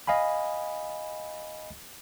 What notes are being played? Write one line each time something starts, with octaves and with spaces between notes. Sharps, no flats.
D#5 F5 G#5 B5